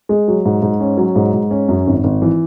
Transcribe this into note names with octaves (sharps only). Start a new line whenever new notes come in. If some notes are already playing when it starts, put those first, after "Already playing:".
G#3
F#3
G#2
G#2
C#4
F#3
G#2
G#2
C#4
F#2
G#1
G#1
E3